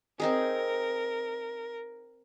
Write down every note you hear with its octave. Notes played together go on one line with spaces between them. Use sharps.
C4 D#4 G#4 A#4